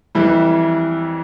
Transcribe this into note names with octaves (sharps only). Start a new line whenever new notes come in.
F2 E3 G3 E4